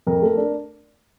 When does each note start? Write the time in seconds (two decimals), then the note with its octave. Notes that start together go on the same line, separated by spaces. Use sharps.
0.07 F2 A#4
0.22 A3
0.37 D4